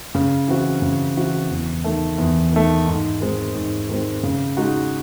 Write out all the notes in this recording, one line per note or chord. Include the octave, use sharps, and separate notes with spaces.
C#3
E3 C4 F#4
C#3
E3 C4 F#4
E2
D#3 A3
E2
D#3 A3
G#2
D#3 G#3 C4
G#2
D#3 G#3 C4
C#3
G#3 D#4 F#4